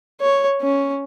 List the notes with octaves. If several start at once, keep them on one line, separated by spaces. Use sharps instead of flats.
C#5
C#4